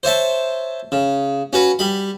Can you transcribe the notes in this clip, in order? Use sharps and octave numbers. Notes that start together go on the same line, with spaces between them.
C5 C#5 E5 A5
C#3
C#4 F#4 B4
G3 B5